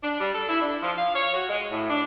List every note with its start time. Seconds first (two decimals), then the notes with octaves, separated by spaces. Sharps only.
0.03 D4
0.20 G3
0.34 A4
0.49 E4
0.61 D4
0.82 F3
0.98 F5
1.15 C#5
1.34 F#4
1.49 G#3
1.71 A2
1.89 D4